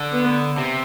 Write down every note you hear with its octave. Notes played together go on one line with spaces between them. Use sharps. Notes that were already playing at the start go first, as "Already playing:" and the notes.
Already playing: D3
B3
C3